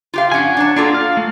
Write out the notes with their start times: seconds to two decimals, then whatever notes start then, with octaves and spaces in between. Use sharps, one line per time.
0.14 F4 G4 F5
0.32 F3 C#4 D4 F#5 G#5
0.57 D4 C#5 A5
0.76 A#3 D4 F4 F#4 A4
0.94 F5
1.17 A3